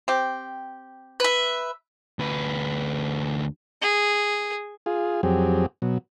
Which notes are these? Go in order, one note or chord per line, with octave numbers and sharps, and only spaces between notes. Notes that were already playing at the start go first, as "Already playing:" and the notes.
C4 G4
B4 E5
D2 B4
G#4
F4 G#4
F2 F#3 C4 G4 G#4
B2 F#3